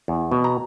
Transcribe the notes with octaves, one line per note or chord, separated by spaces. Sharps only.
E2
B2
A#5